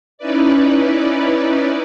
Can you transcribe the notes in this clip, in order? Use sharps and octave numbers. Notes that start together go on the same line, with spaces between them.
C#4 D#4 E4 B4 D5